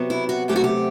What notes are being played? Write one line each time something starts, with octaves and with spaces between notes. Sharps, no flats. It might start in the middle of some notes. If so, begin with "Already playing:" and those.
Already playing: C3 F#3 B3
E4
F#4
C3 F#3 A3 C4 G4
F#4
G4